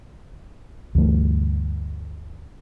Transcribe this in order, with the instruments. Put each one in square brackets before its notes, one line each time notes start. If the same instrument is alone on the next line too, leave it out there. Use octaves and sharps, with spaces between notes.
[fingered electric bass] D2 G2 E3 A3